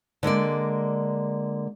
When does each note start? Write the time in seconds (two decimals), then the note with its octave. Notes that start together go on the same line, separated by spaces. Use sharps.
0.23 D3 G#3 A#3 D5